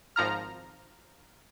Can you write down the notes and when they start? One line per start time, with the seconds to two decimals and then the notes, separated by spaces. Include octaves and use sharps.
0.16 G#1 F3 A#5 F6